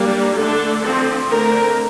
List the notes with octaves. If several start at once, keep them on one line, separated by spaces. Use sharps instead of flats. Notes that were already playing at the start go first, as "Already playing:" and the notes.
Already playing: G3 A#3 D4
D3 A3 D4 A4
D3 F3 C4
D3 A3 C4 A#4